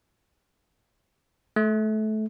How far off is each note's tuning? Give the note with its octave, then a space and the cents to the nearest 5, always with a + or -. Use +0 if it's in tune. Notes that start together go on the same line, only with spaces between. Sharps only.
A3 -25